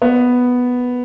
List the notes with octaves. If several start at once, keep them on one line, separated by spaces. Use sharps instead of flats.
B3